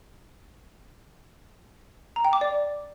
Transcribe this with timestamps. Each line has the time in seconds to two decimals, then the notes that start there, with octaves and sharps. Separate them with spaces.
2.16 A#5
2.25 G5
2.33 D6
2.41 D5